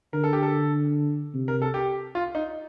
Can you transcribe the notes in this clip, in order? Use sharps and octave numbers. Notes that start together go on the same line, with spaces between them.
D3 A#4
A4
G4
A4
C3
A#4
A4
G4
F4
D#4